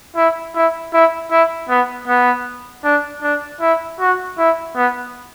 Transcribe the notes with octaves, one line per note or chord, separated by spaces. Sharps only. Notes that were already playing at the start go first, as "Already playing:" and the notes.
E4
E4
E4
E4
B3
B3
D4
D4
E4
F#4
E4
B3